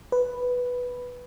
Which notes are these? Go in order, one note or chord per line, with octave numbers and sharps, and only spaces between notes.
B4